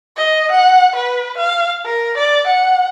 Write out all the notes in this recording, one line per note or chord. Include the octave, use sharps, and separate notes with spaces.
D#5
F#5
B4
F5
A#4
D5
F#5